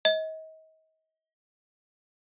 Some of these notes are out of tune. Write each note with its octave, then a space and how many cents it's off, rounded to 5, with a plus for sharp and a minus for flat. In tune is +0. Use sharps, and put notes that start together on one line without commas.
D#5 +35